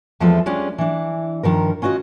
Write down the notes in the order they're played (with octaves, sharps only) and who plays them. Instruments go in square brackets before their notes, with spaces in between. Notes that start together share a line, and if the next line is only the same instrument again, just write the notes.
[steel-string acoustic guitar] E2 F3 G#3 C4 A4 E5
G3 G#3 C#4 D4 F4
E3 D4
G2 D#3 F3 A#4
C#4 F4 F#4 C#5 D#5